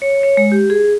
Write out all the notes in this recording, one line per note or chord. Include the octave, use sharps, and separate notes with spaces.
C#5
C#5
G#3
G4
G#4